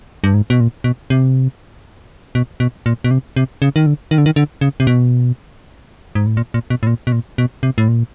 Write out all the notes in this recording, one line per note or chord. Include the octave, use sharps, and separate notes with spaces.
G2
G#2
B2
A#2
B2
C3
B2
B2
A#2
B2
C3
C3
C#3
D#3
D3
D#3
D3
D#3
D3
C#3
C3
B2
G#2
A2
A#2
A#2
B2
A2
A#2
B2
A#2
B2
C3
A2
A#2